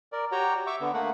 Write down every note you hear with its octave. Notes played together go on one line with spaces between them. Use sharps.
A#4 D5
F#4 G4 C#5 G5 A#5
E5 C#6 D6
D3 B3
A3 A#3 F#5